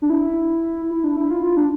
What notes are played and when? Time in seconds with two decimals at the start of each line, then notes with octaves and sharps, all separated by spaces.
0.02 D4
0.10 E4
0.91 E4
1.04 D4
1.17 E4
1.30 F4
1.43 F4
1.57 D4